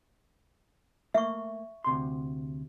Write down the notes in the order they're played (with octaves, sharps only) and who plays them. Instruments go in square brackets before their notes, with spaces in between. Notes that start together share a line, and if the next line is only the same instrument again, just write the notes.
[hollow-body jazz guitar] A3 A#3 [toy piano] E5 C#6
[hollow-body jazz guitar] D2 C3 C6